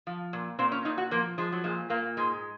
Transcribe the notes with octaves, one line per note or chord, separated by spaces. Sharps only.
F3
A#2
A#2 C4
C#4
A#2 D#4
F#4
F3 A#3
F3 G#3
F#3
A#2 G#3
A#2 A#3
G#2 G#3